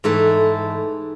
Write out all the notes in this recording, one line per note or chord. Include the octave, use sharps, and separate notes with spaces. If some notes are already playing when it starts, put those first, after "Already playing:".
G#2 E3 A3 A4